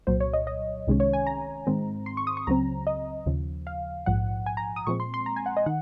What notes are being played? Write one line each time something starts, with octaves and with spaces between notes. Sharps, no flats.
C2 A#2 F#3 C5
C#5
D#5
D#5
C2 C3 D#3 G#3 C#4
C#5
G#5
A#5
G#2 D#3 G#3 C4
C6
C#6
D#6
C#6
C#2 C#3 F#3 C4 A#5
D#5
D#2 C#3 F3
F5
A#1 G#2 F3 F#5
G#5
A#5
D#6
A#2 F3 G#3 C4 C#6
C6
C6
A#5
G#5
F#5
D#5
D#3 F#5